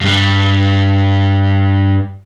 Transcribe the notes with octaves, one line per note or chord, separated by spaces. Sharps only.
G2 G3